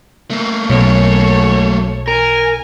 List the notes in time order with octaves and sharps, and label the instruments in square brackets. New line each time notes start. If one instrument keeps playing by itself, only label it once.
[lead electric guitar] A3 A#3
[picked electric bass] B1 B2 [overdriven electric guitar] F#2 [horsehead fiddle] A4 C#5
[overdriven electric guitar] A#4 [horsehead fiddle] G#5